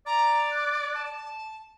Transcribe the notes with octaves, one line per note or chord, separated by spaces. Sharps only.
D5 A#5
F#6
A5